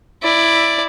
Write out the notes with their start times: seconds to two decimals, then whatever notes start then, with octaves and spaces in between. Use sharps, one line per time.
0.23 E4 D5